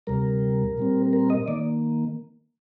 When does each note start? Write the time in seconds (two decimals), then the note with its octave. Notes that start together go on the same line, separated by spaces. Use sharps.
0.07 D2 C3 G3 A#4
0.77 A#2 G3 C4
1.13 A#4
1.30 D#5
1.48 D#3 A#3 D5